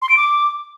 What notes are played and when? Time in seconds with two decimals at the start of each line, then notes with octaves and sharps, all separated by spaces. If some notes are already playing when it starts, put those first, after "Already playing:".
0.02 C6
0.09 D7
0.17 D6